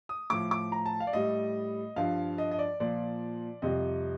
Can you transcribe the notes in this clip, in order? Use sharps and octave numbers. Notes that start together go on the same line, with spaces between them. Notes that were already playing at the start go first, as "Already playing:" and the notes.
D#6
A2 F3 D6
D6
A#5
A5
F5
D5
A2 G3 D#5
G2 F3 F5
D#5
D#5
D5
A#2 F3 D5
F2 C3 G3 D#5